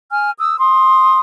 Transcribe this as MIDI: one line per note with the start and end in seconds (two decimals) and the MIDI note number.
0.11 0.31 80
0.11 0.31 89
0.40 0.57 87
0.40 0.57 88
0.59 1.21 84
0.59 1.21 87